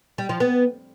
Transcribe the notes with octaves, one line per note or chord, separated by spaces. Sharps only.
G3
F3
B3